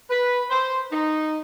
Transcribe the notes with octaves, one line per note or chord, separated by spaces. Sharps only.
B4
C5
D#4